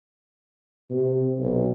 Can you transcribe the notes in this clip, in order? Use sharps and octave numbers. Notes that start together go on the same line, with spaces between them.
C3
B1